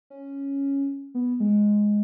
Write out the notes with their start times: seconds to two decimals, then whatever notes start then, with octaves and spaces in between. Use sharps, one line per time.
0.10 C#4
1.15 B3
1.40 G#3